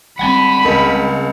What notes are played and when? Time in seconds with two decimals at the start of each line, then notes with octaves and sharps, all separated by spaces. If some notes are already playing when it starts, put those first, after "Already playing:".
0.19 G3 G#3 C4 F#5 G#5 A5 B5
0.65 C#2 A#4